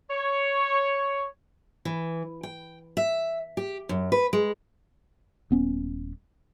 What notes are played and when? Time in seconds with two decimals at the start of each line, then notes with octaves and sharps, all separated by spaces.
0.10 C#5
1.85 E3
2.43 G5
2.97 E5
3.57 G4
3.89 F#2
4.12 B4
4.33 G#3
5.50 D#1 B3 C#4